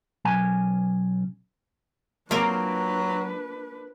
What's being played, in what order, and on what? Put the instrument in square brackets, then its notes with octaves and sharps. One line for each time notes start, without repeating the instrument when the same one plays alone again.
[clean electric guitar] B1 C#4 G#5
[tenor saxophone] F#3 [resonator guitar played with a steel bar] A#3 C4 [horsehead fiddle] D4 B4 [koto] F4 A#4